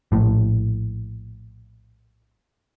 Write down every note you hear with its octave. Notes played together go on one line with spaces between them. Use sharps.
A#1 A2